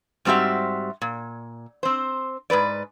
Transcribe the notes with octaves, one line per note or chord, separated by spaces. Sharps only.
G#2 G3 C4 F#4 G4 E5
A#2
C4 C5
G#2 C#3 B4 D5